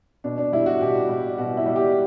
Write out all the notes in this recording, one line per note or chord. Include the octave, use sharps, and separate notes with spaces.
B2 D4
D4
G3 E4
F#4
B2 G4
G3
B2 F#4
E4
G3
G4